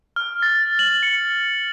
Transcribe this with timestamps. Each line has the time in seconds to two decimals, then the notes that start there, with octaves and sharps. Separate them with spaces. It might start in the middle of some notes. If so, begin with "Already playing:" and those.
0.16 F6
0.42 A6
0.79 F#7
1.03 C#7